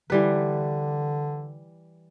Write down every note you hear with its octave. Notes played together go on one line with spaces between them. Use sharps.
D3 E3 G3 B4